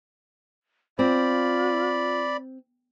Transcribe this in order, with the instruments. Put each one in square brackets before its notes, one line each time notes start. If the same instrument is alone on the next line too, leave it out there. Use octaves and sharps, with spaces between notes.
[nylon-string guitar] C4 [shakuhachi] F4 [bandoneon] D5 B5